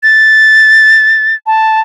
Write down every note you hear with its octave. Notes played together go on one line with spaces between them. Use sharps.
A6
A5